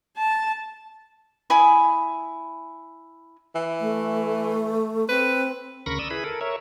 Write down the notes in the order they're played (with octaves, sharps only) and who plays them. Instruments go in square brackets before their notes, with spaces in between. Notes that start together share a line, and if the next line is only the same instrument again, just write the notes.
[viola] A5
[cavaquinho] E4 G#5 B5 D#6
[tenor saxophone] E3
[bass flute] A3
[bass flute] C4 [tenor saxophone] B4
[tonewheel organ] D2 C#3 A#4 B5 C#6 A#6
D5 D#6 E6
E4 G#4 B4 B5
A4 A#4
A#4 C#5 E5